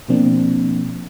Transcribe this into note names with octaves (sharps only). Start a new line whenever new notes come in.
B2 F3 A#3 C4 D4